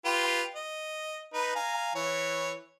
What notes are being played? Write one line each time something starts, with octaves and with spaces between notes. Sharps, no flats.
F4 G4 B4
D#5
D#4 B4
F5 G#5 A#5
E3 C#5